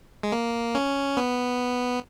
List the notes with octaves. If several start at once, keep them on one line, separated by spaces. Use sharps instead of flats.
G#3
A#3
C#4
B3